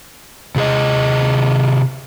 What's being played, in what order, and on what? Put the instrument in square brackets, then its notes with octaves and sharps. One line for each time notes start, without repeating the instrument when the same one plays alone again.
[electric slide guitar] C3 G#4 D#5